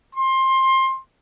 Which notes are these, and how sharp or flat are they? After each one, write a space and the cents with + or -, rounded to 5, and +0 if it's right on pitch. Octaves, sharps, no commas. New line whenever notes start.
C6 +20